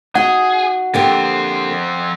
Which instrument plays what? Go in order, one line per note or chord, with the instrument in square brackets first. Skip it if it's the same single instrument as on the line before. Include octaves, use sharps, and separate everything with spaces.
[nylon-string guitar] D#4 F#4 [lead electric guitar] G#4 [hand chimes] F#5
[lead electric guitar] F2 C4 [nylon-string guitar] D3 A#3 G4